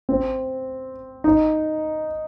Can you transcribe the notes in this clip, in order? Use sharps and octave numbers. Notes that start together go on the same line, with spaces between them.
C4
D#4